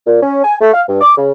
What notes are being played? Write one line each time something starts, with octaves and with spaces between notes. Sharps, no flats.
A#2
C#4
G#5
A3
F5
G2
D6
C#3